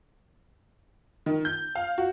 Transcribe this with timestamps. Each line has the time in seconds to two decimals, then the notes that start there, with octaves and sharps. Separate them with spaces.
1.26 D#3
1.45 G6
1.75 F5
1.98 F#4